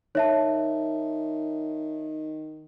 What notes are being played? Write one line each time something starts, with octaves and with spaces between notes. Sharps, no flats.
D#3 C#5 E5 A5